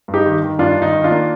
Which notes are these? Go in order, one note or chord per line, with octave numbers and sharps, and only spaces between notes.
G2
D#4 G4
D#3
D#3
G2 D4 F4
D#3
D#4
D#3
D4 F4
A#3